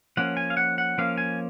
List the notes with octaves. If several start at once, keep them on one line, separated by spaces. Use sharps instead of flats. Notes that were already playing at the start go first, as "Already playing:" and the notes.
F3 A#3 C#4 F#5
G#5
F5
F#5
F#5
F3 A#3 C#4 F5
G#5